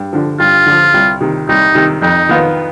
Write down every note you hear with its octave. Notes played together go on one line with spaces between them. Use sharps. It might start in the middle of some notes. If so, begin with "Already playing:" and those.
Already playing: G2
D3 F3
G2 F4
D3 F3
C2
C3 D#3
C2 D#4
C3 D#3
F2 D#4
D#3 B3 F4